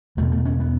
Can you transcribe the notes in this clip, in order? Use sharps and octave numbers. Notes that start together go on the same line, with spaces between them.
E2 B2 A3
A3
C#4
B3